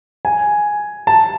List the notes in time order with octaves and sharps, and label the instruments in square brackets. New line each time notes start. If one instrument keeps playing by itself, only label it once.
[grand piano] G#5
A5